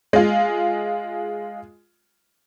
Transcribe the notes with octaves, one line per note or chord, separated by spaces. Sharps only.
G#3 F4